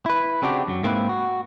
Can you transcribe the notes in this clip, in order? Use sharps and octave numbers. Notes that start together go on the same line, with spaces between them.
E4 B4
C#3 C4 D4 F#4 G4
F#2 F#3
G#2 A#3 C4 E4 B4
F#4